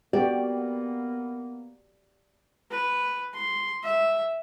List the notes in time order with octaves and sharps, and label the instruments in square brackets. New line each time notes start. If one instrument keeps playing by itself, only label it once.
[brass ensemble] A#3 B3 [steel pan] F#4 G4 [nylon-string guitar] D5
[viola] B4
C6
E5